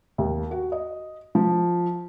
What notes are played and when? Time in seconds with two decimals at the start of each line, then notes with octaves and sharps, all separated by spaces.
0.18 D#2
0.51 F#4
0.72 D#5
1.35 F3